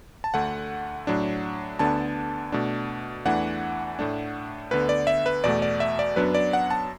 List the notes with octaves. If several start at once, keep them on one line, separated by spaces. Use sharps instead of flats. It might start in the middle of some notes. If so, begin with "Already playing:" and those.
A5
D2 D3 A3 F#5
A2 F#3 D4
D2 D3 B3 D4 A5
B2 A3 D4
E2 E3 A3 D4 F#5
A2 A3 D4
D2 D3 B3 B4
D5
E5
B4
E2 B2 A3 D5
D5
E5
D5
F#2 F#3 B3 D4 B4
D5
F#5
A5